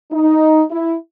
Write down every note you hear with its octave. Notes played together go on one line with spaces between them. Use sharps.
D#4
E4